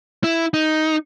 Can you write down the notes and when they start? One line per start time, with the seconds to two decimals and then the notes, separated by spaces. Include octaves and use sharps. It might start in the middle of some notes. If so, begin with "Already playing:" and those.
0.24 E4
0.54 D#4